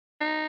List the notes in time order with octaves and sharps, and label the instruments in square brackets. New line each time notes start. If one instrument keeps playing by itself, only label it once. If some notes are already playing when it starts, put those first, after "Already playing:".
[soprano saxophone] D#4